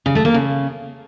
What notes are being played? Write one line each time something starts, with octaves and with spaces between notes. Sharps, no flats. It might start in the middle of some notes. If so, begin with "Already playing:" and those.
C#3
A3
A#3
C#3